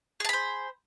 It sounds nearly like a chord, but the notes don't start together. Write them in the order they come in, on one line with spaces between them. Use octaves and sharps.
G#4 A5 B5 C5